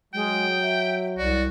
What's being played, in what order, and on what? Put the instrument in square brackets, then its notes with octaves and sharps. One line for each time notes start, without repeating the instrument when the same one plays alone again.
[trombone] F#3 [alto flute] G#3 [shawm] G5
[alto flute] E5
[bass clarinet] C2 [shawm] F#4 [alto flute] D5